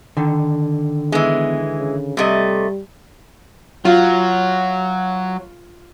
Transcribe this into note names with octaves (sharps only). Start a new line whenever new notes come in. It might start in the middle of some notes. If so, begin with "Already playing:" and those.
D3 D#3
E3 G#3 B3
C#3
C3 G3 A3 D#5
F#3 F4